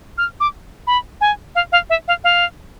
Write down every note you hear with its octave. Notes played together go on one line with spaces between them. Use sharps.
F6
D6
B5
G#5
F5
F5
E5
F5
F5